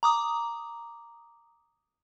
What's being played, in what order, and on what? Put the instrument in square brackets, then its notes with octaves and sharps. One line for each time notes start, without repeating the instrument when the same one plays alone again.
[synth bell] A#5 D6 D#6